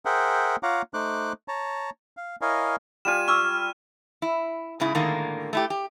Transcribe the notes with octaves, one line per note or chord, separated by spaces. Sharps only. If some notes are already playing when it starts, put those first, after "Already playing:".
G#4 A#4 C5 E5 F#5 G5
F4 C#5 F5 F#5 A#5 D6
A3 D#4 C5 D6 F#6
C#5 A5 A#5
F5
E4 A#4 C#5 D#5 F5 G#5
G3 F4 G#5 D#7 E7
C#6 D6 E6 F6
E4
G#2 C#3 E4
A2 D3 D#3 G#3 A#3
A3 E4 G4
G4